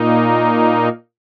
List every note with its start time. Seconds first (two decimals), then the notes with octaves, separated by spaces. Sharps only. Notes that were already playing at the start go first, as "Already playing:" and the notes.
Already playing: A#2 A#3 D#4